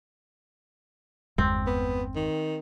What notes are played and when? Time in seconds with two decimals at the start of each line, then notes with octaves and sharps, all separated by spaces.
1.38 G1 E2 G#3 C4
1.67 B3
2.16 D#3